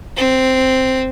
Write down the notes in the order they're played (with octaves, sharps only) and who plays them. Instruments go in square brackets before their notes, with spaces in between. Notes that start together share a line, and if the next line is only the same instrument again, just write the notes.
[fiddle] C4